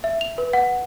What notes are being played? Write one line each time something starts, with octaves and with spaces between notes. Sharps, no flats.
E5
F7
B4
F#5